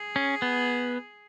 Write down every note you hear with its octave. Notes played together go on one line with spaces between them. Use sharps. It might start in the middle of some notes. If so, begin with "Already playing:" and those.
Already playing: G#4
C#4
B3